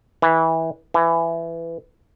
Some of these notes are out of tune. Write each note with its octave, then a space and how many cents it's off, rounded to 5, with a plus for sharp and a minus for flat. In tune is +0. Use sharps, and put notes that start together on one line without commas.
E3 -20
E3 +15